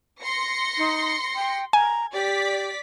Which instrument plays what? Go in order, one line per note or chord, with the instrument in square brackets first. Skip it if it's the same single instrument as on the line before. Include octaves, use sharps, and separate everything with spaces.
[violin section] C6 A#6 C#7
[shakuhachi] D#4
G5
[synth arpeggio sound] G#5 [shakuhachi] A#5
[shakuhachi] G4 [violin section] D5 B6